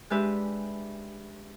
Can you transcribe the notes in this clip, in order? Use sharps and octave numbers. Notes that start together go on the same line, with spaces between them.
G#3 D4 G4 B4 E5